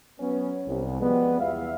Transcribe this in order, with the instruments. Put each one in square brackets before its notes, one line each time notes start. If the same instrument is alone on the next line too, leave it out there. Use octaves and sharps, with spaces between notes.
[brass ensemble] F#3 B3 C#4
C2
F3 G3 G#3 B3
E2 E5 F5